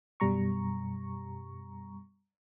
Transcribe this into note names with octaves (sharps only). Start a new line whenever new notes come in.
F#2 B2 G3 A#5 C#6